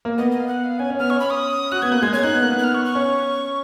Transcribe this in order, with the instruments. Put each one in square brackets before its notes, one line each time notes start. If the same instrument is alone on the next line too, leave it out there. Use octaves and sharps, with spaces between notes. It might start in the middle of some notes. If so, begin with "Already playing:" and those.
[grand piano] A#3
[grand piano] B3 [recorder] D#5
[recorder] D#5
F5
F#5
F5
[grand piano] C#4 [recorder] G#5
[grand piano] C#4
[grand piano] B3 [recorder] F6
[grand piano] C#4 [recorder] C#6
[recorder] B5
D#6
[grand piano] F#4 [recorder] F#6
[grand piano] B3 [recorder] G#6
[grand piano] A#3 [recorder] F#6
[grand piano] G#3 [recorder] G#6
[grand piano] C#4 [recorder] G#6
[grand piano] D#4 [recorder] F#6
[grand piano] B3
A#3
B3
[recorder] F#6
F6
C#6
C#6
[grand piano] C#4